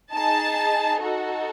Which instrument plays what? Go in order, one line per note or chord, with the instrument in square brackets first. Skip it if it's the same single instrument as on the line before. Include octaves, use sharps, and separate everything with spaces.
[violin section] D#4 G#4 A5
D#4 F#4 A4